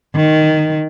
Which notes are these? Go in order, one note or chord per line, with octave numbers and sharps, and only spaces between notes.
D#3